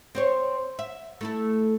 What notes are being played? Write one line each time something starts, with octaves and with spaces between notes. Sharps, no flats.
C4 C5 C#5
E5
A3 E4 A4